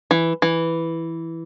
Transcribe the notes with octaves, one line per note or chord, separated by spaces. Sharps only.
E3
E3